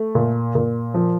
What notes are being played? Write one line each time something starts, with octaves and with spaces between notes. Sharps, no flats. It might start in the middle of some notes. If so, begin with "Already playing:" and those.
Already playing: A3
A#2
A#2
F3